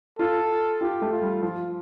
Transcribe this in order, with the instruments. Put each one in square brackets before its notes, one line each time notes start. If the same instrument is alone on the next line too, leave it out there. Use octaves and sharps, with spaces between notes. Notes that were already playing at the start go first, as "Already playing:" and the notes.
[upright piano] F4 [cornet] A4
[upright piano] F4 [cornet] G4
[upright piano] A3
[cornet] F4
[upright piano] G3
[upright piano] F3 [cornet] F4